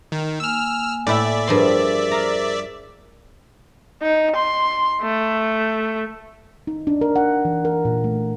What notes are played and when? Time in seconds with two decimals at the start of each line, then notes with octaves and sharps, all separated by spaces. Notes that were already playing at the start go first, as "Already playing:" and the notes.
0.12 D#3
0.40 A#3 G#5 E6 F6
1.07 A2 E4 D5 E5
1.48 G2 F3 G#4 A#4 C5 C6
2.11 F5 A#5
4.02 D#4
4.36 C6
5.01 A3
6.67 D#4
6.87 D4
7.01 A#4
7.16 F#5
7.45 E3
7.65 A#4
7.85 A#2
8.04 A3